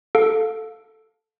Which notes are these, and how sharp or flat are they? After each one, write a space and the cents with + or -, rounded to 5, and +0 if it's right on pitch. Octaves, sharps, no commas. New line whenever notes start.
A4 +0 F5 +20